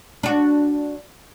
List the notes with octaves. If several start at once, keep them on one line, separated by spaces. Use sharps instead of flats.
D4 F#4